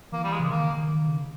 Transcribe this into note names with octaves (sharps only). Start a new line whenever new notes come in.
E3 A#3
G3
G#3
C#3
D#3 A#3
D#3
D#3
C#3